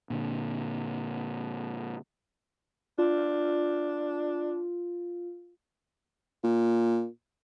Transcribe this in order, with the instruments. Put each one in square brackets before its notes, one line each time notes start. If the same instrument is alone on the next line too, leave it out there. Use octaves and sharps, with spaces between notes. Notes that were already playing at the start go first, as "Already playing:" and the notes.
[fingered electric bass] A#2 D3
[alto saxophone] D4 [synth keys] F4
[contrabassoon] A#2